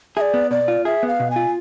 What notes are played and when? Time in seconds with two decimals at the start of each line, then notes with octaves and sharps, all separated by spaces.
0.17 G#4 D5 E5
0.34 B3
0.51 B2 D5
0.68 F4
0.85 G#4 E5
1.03 B3 F5
1.20 B2
1.31 G#5
1.36 F4